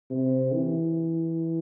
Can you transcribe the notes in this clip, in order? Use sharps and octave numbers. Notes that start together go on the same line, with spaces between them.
C3
E3